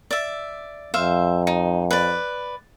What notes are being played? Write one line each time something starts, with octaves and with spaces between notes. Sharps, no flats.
D5 E5
F2 C5 E5 F5
D#4
B4 D5